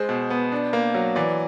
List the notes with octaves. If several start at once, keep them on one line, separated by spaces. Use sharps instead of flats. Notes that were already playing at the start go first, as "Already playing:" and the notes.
Already playing: G#3 C5
B2
B3
D4
A#3
F#3
E3 D5